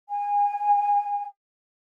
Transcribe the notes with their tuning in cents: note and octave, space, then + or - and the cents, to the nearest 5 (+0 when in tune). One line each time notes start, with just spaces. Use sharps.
G#5 -25